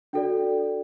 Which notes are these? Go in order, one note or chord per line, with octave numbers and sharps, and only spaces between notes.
D4 F#4 A4 D5 G5